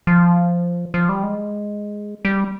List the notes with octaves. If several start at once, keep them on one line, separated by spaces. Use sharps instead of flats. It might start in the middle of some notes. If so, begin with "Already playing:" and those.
F3
F3
G3
G#3
G3